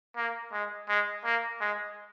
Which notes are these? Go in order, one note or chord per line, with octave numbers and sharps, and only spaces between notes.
A#3
G#3
G#3
A#3
G#3